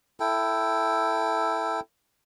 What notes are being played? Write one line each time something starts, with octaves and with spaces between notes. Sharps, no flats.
E4 A4 G5